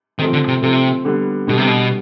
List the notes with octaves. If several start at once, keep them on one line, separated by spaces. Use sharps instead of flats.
D#3 F3 A3 C4
D3
C3
C3 F3 A3 C4
D3 G3 B3
B2 D3 G3 B3
C3
B2